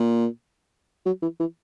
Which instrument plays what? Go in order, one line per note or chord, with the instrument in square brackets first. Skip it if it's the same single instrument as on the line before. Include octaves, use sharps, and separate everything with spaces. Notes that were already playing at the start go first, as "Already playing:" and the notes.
Already playing: [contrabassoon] A#2
F#3
E3
E3